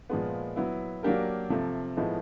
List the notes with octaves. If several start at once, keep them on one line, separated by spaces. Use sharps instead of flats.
A#2 F3 G#3 B3
F#3 B3 E4
F#3 A#3 D4 G4 A#4
C3 F3 A3
A2 F3 G#3 B3 D#4